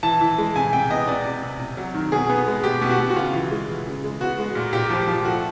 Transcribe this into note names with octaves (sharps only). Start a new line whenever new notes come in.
E3 A5
E3
G#3
C3 G#5
C3 G5
B3 D#5
C3 D5
C3
C3
C3
F#3
D#3
B2 G#4
B3
G#3
B2 G4
B2
F#4
B2
F#4
C#3 F4
E3
G#3
E3
C#3
G#3
B3 F#4
G#3
A#2
A#2 G4
F3
F3
A3 F#4